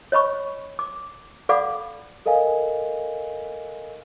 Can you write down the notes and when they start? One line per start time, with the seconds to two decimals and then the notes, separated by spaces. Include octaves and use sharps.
0.12 C#5 D#5 B5 C#6
0.79 D6
1.49 A4 D5 F5 F#5 B5 D6
2.26 A4 A#4 D#5 F5 G#5